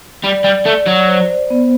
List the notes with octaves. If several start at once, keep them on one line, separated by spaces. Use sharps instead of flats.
G3 D5
G3
A3 D5
F#3
C5
B3